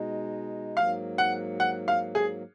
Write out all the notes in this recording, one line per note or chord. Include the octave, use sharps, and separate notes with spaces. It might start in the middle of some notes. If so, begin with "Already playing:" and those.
Already playing: B2 G#3 D#4
G#2 F#3 A#3 F5
F#5
F#5
F5
G#4